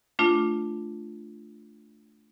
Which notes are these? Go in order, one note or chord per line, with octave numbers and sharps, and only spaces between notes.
A3 D4 F4